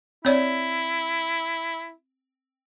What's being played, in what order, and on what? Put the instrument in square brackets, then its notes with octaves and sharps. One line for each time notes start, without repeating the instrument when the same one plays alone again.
[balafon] C4 C#5 D5 [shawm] E4